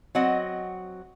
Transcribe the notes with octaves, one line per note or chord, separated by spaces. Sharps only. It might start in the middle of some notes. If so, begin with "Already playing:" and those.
F#3 C4 D#5 F#5